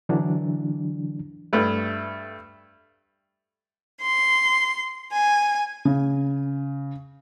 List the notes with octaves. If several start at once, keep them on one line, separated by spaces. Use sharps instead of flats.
D3 E3 F#3 D4
G2 A3 B4
C6
G#5
C#3